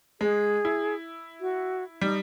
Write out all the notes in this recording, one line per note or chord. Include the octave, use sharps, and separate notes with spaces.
G#3 G#4
E4
F#4
G3 D#4